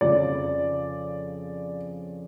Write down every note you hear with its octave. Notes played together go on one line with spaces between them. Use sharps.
F2 C#3 F3 D5